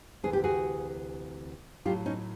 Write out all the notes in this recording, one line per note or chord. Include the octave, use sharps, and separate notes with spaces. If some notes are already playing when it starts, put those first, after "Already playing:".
D2 C3 E3 G#4
G4
F#4 G#4
A2 F#3 F4 G4
C#4 D#4